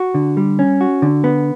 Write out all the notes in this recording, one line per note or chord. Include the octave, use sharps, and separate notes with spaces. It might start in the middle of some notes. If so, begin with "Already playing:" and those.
Already playing: F#4
D3
G3
C#4
F#4
D3
B3